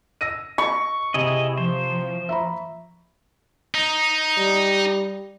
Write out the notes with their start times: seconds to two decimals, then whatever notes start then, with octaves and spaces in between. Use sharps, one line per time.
0.21 E6 A#6 D#7
0.58 C#6
1.14 C3 E4 G#4 D#5
1.58 F3 C5
2.29 E5 A#5 B5
3.75 D#4
4.37 G3